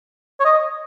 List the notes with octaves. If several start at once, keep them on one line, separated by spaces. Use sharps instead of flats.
C#5
D#5